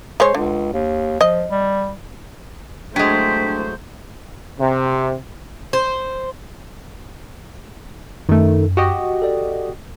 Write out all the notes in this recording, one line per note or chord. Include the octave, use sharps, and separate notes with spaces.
G#3 C5 C#5
C#2 D3
D#2
F3 D#5
G3
F#3 G#3 A3 D4 C5 G5 B6
C3
C5
F#2 D#3 A3
F#4 G4 D#5
A4 D5